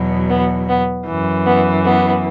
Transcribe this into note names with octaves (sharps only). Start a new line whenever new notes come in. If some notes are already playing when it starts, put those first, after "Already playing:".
Already playing: E2 B2 F#3
B3
B3
F#2 E3
B3
B3